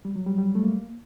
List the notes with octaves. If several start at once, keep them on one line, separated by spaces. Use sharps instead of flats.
G3
F#3
G3
G3
A3
A#3